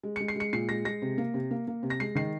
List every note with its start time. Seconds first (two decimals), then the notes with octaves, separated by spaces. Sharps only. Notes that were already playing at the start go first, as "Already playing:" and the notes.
0.03 G#3
0.16 C#7
0.20 G#3
0.28 C7
0.36 G#3 C#7
0.53 A#2 C7
0.69 G#3 A#6
0.85 G#3 A#6
1.02 C3
1.18 A#3
1.34 C3
1.51 A#3
1.67 A#3
1.83 C3
1.90 A#6
2.00 G#3 C7
2.15 D#3 C7